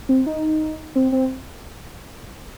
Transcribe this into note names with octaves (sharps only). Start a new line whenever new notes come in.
C4
D#4
C4
C4